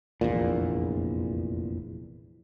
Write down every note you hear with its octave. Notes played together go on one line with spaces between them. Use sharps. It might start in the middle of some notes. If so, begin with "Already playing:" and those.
F1 A#1 E2 A#2